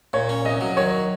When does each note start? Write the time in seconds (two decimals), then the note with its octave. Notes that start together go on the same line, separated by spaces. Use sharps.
0.13 A#2 C#5
0.29 C#4
0.45 C2 D#5
0.61 F#3
0.77 D#3 C#5